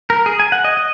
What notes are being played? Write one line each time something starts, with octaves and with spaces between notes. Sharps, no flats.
A#4
G#4
G#5
F#5
D#5
D#5